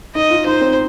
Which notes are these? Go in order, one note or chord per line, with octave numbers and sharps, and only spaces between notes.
D#4 D#5
F4
D#4 C5
C4